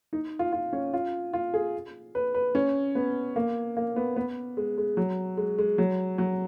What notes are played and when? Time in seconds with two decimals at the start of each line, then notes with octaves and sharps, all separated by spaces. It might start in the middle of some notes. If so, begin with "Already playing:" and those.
0.13 D#4
0.39 F4
0.52 F4
0.73 C#4
0.94 F4
1.33 F4
1.54 G#4
2.15 B4
2.35 B4
2.55 C#4
2.95 B3
3.36 A#3
3.77 A#3
3.96 B3
4.16 B3
4.57 G#3
4.78 G#3
4.97 F#3
5.37 G#3
5.58 G#3
5.78 F#3
6.18 F#3